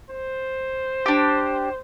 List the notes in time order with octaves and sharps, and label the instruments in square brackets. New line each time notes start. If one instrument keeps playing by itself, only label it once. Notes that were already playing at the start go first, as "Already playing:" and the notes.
[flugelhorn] C5
[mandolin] D4 G4